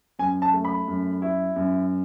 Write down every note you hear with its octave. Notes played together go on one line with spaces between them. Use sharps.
F#2 G#5
A5
A3
B5
F#2
E4
F#2